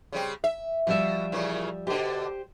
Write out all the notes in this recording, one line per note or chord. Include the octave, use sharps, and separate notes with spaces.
C#3 G3 C4
E5
B2 F3 G3 E5
A#2 C#3 E3
B2 D3 G4 C5